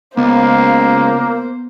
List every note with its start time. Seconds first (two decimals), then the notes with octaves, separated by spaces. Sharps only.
0.17 C#2 A#3 B3 C5